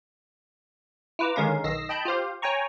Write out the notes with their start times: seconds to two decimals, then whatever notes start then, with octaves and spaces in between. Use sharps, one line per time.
1.19 E4 F4 B4 A#5 D6
1.36 D3 D#3 G#3 C#4 A#4 F5
1.64 B1 D#3 D#5 E6 A#6 C7
1.89 D#5 G5 A5 B5 G6
2.05 F4 G4 C5 F5
2.42 C#5 G5 G#5 A#5 C#6